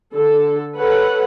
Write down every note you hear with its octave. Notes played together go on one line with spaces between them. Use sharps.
D3 A4
A4 B4 C#5 F#5